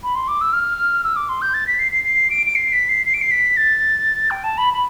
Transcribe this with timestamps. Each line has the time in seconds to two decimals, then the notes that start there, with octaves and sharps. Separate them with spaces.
0.03 B5
0.15 C6
0.28 D6
0.41 E6
0.53 F6
1.04 E6
1.16 D6
1.29 C6
1.42 G6
1.54 A6
1.67 B6
1.79 C7
1.92 C7
2.04 C7
2.30 D7
2.46 D7
2.55 C7
2.72 B6
2.89 C7
3.06 C7
3.14 D7
3.22 C7
3.31 B6
3.57 A6
4.31 G5
4.44 A5
4.58 B5
4.74 B5